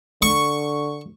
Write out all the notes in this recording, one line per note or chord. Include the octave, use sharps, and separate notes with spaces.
D3 C#6